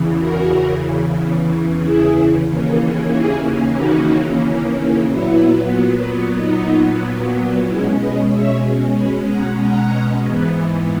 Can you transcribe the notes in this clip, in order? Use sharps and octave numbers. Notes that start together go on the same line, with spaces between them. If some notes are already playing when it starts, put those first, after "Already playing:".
Already playing: E2 C#3 E3
F#4 A#4
E4 G#4
D#2 C#3 E3 A#3 C#4
E4 G#4
D#4 F#4
A#2 F#3 B3 E4
D#4
B2 G#3 C#4 E4
B4 D#5
C#5 E5
G#5 B5
F#5 A#5
F#5 A#5
G#2 E3 B3